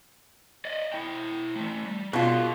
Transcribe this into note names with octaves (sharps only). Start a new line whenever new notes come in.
D5 D#5
E4 G5
E3 A3
G3
B2 F4 F#4 G#4